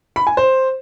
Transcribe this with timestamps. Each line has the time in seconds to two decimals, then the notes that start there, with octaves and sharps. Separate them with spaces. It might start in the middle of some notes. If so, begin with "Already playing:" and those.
0.16 B5
0.27 G#5
0.37 C5